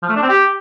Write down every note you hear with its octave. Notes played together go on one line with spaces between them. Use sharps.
F3
A3
D4
C4
G4